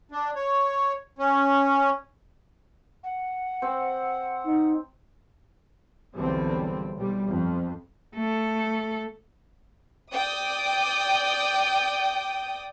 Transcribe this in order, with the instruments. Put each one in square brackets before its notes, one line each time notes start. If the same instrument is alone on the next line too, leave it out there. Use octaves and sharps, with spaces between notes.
[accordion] D4
C#5
C#4
[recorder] F#5
[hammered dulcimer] C4
[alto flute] D#4
[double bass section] B1 E2 D3 G3 C4
B1 G3
F2
[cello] A3 A4
[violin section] D5 G5 D#6